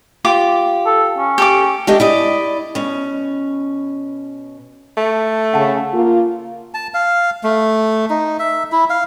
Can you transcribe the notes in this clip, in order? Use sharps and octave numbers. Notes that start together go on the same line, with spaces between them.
F4 G4 D6
A4
C#4
G4 A4 D6
A3 C4 D4 G4 D#5 G5
E4 D5 D#5
B2 C#4
A3
C#3 F#5 A5
A#3 F4
A5
F5
A3
D#4
E5
E4
F5